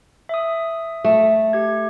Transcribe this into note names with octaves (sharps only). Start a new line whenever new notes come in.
E5 D#6
A3
G4 G#6